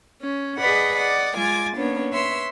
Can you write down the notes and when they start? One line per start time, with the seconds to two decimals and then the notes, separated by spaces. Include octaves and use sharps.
0.23 C#4
0.58 G#4 B4 D5 D#5 F#5 B5
0.96 D5 D#5 F#5
1.35 G#3 F4 G#5 D6 G#6 A6
1.76 A#3 B3 C#4 D4 C#5
2.13 B4 C#5 E5 C6 E6